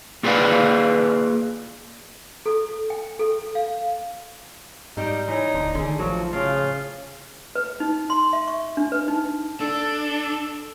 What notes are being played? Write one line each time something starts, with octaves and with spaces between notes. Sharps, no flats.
A#3 F4 G#4 B4 D5 F5
A4
G5
A4
F5
G#2 G3 D#4 G4
E3 G3 D#4 C#5
D1 D3
A1 D3 D#3 G#4
A2 F3 F#3
A2 C#3 F4
B4
D#4
C6
E5
C#6
D4
B4
D#4
D4 A4